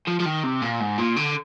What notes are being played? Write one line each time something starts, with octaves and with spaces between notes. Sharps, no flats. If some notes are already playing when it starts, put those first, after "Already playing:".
F3
F3
D#3
C3
A#2
G#2
A#2
D3